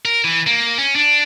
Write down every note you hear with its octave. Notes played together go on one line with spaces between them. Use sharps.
A#4
E3
A#3
C#4
D4